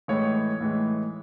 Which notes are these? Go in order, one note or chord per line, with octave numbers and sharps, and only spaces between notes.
A2 E3 G#3 C#5
A2 E3 G#3